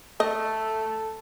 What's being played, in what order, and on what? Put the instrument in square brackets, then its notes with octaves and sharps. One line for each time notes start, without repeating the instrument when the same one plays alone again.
[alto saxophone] A3 [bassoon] A4 [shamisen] D#5